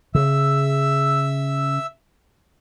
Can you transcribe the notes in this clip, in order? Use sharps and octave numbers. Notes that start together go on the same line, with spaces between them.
C#3 E5 E6